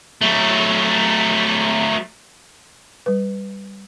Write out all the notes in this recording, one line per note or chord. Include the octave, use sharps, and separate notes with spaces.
F#3 A3
G3 B4